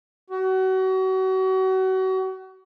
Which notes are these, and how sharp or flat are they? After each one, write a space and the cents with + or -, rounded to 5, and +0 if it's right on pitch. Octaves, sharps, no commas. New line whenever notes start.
F#4 +35